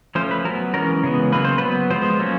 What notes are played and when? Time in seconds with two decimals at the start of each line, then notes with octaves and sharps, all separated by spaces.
0.15 F3 A3 C#4 C5
0.31 B4
0.45 F#3 A#4
0.49 B3
0.74 E3 G#3 C#4 A#4
1.04 C#3 E3 G#3 B3
1.32 C#3 F#3 A#3 B4
1.44 C5
1.58 F#3 B3 B4
1.90 F3 G#3 B3 C5
2.20 F#3 A#3 C#4